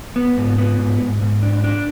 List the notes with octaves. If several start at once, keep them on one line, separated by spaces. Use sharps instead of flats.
B3
G#2
B3
G#2
G#2
G#2
D4
D4